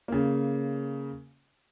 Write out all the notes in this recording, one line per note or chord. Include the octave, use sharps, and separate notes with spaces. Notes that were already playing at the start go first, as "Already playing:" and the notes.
C#3 A#3